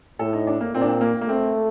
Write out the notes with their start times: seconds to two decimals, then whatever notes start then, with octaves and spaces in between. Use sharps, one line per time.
0.19 A2 A4
0.33 D#4
0.47 D4
0.60 A#3
0.74 A#2 C4
0.81 D4
0.88 C4
1.01 A#3
1.21 A#3
1.28 A3 C4